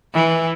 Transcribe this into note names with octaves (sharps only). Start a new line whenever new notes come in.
E3